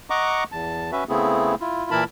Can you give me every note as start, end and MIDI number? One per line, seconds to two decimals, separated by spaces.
0.10 0.44 75
0.10 0.44 78
0.10 0.44 82
0.10 0.44 85
0.10 0.44 86
0.52 0.91 40
0.52 0.91 81
0.92 1.04 61
0.92 1.04 66
0.92 1.04 71
0.92 1.04 76
1.09 1.55 49
1.09 1.55 57
1.09 1.55 59
1.09 1.55 60
1.09 1.55 64
1.09 1.55 68
1.61 1.91 64
1.61 1.91 65
1.91 2.04 46
1.91 2.04 52
1.91 2.04 64
1.91 2.04 70
1.91 2.04 81
1.91 2.04 83